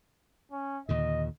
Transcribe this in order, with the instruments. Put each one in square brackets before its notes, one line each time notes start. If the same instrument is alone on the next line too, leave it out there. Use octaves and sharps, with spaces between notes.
[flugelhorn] C#4
[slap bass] D#2 A#2 D3 [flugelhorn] D#5